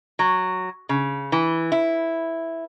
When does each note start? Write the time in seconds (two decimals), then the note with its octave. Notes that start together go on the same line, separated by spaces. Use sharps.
0.19 F#3
0.89 C#3
1.32 E3
1.72 E4